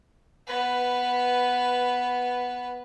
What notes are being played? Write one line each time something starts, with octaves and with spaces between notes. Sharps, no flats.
B3 B4